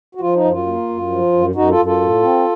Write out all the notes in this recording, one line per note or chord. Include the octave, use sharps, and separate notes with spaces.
F#4
F3 F4
D#4
F#2
F4
A#3
F#2
F3
F#2
F#2 D#4 F#4
F4 A4
F#2
F4 A4
A2
C4